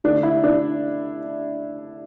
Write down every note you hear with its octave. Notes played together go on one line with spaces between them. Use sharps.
D3 A3 D4
E4
D4